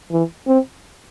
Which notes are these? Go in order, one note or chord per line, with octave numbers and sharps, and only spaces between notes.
E3
C4